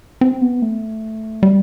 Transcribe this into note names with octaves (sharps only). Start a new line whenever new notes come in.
C4
B3
A3
G3